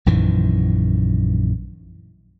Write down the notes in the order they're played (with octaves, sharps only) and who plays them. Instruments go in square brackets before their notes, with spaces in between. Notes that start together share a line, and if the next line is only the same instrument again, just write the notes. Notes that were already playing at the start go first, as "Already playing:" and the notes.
[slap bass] A#1 F#2 D#3 E3